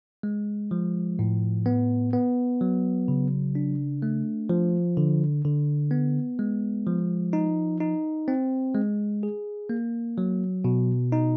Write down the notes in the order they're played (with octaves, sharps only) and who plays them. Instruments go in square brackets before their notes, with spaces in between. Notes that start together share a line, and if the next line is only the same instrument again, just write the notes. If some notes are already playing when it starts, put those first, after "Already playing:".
[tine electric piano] G#3
F3
A2
B3
B3
F#3
C#3
D4
A3
F3
D3
D3
B3
G#3
F3
D#4
D#4
C4
G#3
G#4
A#3
F#3
B2
D#4